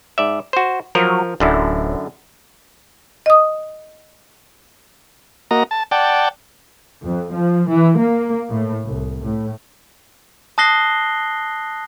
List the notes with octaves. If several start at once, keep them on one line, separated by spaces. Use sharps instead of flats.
G#2 D5 E5
F#4 C5
F3 F#3 A#4
D1 F#2 D3 E4
D#5 D#6
A#3 F#4 D#5 A#5
A5
D5 F#5 G5 A5
F2
F3
E3
A#3
A2
C2
A2
A5 D#6 F#6 A#6 C7 G7